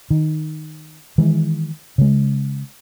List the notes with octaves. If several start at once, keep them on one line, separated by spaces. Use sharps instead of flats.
D#3
D#3 E3 G#3
C#3 G#3